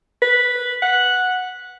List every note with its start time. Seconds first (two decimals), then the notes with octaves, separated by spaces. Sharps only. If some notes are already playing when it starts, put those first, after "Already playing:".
0.22 B4
0.83 F#5